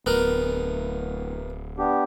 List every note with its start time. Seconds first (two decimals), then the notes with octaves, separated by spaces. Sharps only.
0.06 D1 B3 A#4
1.78 B3 D4 G4